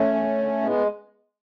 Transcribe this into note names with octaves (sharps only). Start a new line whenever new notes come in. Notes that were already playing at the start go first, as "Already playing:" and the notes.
Already playing: A3 C#4
E2
D3
A2 G#3 B3